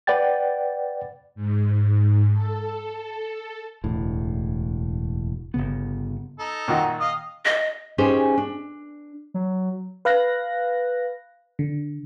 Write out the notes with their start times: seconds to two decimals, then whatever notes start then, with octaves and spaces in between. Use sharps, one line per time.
0.07 B4 D5 F#5 G5 A6
1.35 G#2
2.32 A4
3.84 E1 D2 A2
5.54 G1 D#2 C#3 B3
6.39 D#4 A4
6.68 A#2 D#3 F#4
7.00 D#5 F5 D#6
7.45 D#5
7.98 C#4 D#4 G4 G#4 C5
8.37 D4
9.34 F#3
10.05 B4 F5 F#6 A#6
11.59 D3